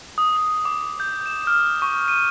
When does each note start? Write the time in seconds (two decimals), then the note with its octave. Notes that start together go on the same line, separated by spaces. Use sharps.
0.18 D#6
0.37 D#6
0.65 D6
1.00 G6
1.26 E7
1.47 F6
1.82 C#6
2.08 D#7